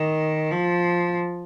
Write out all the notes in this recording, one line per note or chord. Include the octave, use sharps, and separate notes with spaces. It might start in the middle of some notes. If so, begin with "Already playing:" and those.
Already playing: D#3
F3